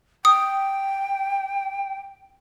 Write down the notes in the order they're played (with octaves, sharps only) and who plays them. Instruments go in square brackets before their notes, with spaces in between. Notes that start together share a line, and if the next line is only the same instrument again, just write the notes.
[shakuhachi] G5 [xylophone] D#6